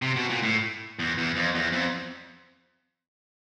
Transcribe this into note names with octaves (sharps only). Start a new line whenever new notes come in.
C3
B2
A#2
A2
E2
E2
F2
E2
F2